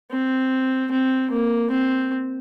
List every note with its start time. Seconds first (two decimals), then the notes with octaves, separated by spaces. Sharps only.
0.11 C4
0.91 C4
1.31 A#3
1.71 C4